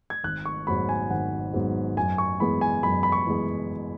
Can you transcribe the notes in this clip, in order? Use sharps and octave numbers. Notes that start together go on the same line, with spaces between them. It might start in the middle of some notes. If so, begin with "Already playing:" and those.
G#6
G#1 F#6
C#6
G#2 F#3 B3 B5
G#5
G#1 F#5
G#2 F#3 B3
F#2 G#5
C#6
E3 G#3 B3 B5
G#5
F#2 B5
B5
C#6
E3 G#3 B3